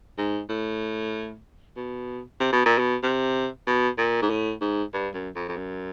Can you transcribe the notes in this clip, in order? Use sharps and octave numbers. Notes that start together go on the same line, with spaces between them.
G#2
A2
B2
C3
B2
A#2
B2
C3
B2
A#2
G#2
A2
G#2
G2
F#2
F2
F2
F#2